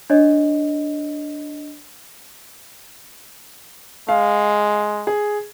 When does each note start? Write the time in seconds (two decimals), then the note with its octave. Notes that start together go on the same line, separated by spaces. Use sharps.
0.10 D4 C#5 D#5
4.09 G#3 F5
5.07 G#4